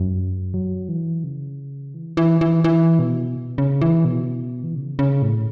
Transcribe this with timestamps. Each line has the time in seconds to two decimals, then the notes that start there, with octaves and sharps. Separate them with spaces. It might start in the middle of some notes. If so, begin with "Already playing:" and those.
Already playing: F#2
0.54 F#3
0.89 E3
1.24 C#3
1.94 E3
2.17 E3
2.41 E3
2.64 E3
2.99 B2
3.58 C#3
3.81 E3
4.05 B2
4.64 E3
4.75 C#3
4.99 C#3
5.22 A2